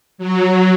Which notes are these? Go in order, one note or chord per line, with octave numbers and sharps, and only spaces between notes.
F#3